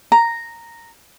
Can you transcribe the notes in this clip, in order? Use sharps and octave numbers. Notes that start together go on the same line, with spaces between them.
A#5